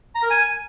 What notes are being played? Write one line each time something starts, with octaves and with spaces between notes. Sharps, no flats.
A#5
A#4
G#5